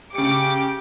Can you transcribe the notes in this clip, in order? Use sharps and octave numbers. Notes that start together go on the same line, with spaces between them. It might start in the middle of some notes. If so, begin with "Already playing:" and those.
C#3 G4 D6 C#7